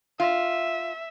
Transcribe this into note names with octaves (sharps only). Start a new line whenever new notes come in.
F4 E5